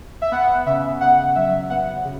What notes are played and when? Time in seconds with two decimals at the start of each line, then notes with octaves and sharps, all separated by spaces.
0.22 E5
0.31 B3 F#5
0.66 C#3 E5
1.01 C#3 F#5
1.35 F#3 E5
1.70 B3 F#5
2.04 C#3